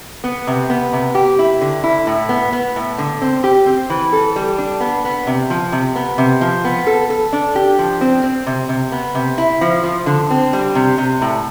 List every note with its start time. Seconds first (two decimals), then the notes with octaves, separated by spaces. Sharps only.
0.24 B3
0.47 C3
0.70 B3
0.93 C3
1.15 G4
1.39 E4
1.61 D3
1.84 E4
2.07 A2
2.29 B3
2.53 B3
2.76 A2
2.98 D3
3.22 C4
3.44 G4
3.66 C4
3.90 E3
4.13 A4
4.36 G3
4.58 D4
4.81 B3
5.05 B3
5.27 C3
5.50 F3
5.72 C3
5.96 B3
6.18 C3
6.41 F3
6.65 B3
6.87 A4
7.10 A4
7.33 D4
7.56 G4
7.79 F3
8.01 C4
8.24 C4
8.47 C3
8.69 C3
8.92 B3
9.15 C3
9.38 E4
9.61 F3
9.83 F3
10.06 D3
10.30 C4
10.53 G3
10.75 C3
10.98 C3
11.22 A2